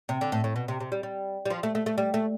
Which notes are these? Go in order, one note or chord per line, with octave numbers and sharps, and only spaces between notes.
C3
D3
A2
A2
B2
C3
C3
G3
G3
G3
F3
A3
A3
A3
G3
A3